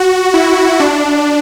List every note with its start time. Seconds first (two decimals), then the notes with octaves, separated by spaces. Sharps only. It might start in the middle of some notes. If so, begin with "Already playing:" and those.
Already playing: F#4
0.34 E4
0.80 D4